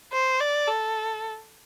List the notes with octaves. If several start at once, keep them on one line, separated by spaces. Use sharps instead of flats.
C5
D5
A4